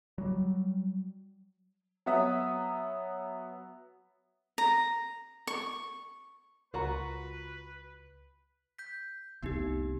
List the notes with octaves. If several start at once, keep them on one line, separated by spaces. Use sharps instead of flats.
F#3 G3
F#3 B3 E5 D#6
A#5
C#6
C#2 F4 F#4 A#4 B4 F#5 A#5
G6 B6
F1 C2 B3 D#4 G4